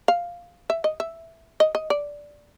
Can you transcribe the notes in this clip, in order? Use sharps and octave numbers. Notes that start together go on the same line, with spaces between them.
F5
E5
D#5
E5
D#5
D#5
D5